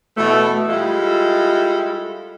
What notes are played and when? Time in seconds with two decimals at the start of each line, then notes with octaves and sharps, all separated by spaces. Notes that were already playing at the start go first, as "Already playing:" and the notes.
0.16 B2 E3 A3
0.69 G3 G#3 E4 F4 A4